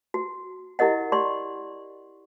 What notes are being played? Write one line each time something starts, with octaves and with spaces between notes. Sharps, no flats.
F#4
E4 G4 A#4 D#5 F#5
G4 D5 C6 C#6